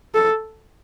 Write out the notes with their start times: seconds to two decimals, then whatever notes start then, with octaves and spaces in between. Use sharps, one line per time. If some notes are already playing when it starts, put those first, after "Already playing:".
0.15 A4